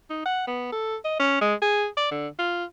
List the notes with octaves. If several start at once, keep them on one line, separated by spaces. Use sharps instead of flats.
D#4
F#5
B3
A4
D#5
C#4
G#3
G#4
D5
D3
F4